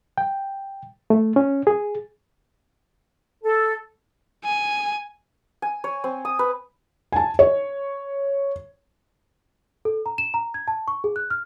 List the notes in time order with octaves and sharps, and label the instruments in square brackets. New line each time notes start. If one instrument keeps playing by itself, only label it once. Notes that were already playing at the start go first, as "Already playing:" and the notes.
[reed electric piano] G5
A3
C#4
G#4
[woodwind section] A4
[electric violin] G#5
[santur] G#5
C#5
C4
D#6
B4
[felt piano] G#5 A5
C#5
[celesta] A4
A#5
E7
A#5
G#6
A5
C#6
G#4
F#6
F6